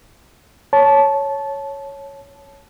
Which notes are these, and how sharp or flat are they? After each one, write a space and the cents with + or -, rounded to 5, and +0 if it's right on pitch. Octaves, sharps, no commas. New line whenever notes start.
C#5 +0 A5 -15